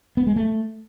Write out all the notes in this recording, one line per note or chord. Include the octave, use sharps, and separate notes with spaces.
B3
G#3
A3